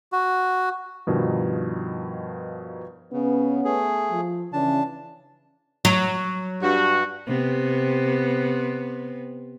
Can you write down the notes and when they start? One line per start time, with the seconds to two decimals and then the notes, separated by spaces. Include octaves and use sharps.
0.12 F#4
1.07 G2 B2 D#3 F3 D#4
3.13 C#3 B3 C#4
3.65 A3 G#4
4.11 F3
4.53 C#3 E3 C#4 D4 A5
5.85 F#3
6.62 G2 F#4
7.27 C3 B3